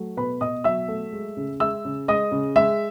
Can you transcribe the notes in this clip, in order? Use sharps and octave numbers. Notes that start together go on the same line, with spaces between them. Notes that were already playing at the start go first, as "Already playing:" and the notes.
Already playing: F#3 A3
B2 B4 B5
B2 D#5 D#6
F#3 E5 E6
A3
G#3
C#3
G#3 E5 E6
C#3
G#3 D#5 D#6
C#3
G#3 E5 E6